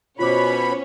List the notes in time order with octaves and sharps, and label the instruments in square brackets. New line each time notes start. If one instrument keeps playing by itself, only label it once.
[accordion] B2 B5 [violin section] C#4 C#5 [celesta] F4 C5 D6